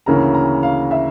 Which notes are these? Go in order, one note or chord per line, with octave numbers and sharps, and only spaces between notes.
D2 C#3 E3 A#3 C#4 A#5
A#5
F5
E5